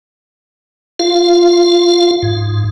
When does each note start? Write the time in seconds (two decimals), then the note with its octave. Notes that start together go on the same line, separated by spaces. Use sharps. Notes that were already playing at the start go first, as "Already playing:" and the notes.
0.99 F4 F5
2.22 G#2